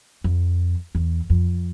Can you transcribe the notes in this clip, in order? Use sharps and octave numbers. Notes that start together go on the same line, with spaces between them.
F2
E2
F2